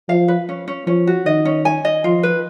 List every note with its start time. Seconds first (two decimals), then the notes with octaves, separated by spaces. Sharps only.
0.09 F3 F5
0.28 B4
0.49 C#4
0.68 C#4
0.87 F3 C#4
1.07 F#4
1.26 D#3 D#5
1.45 C#4
1.65 G#5
1.85 D#5
2.04 F3 F4
2.23 B4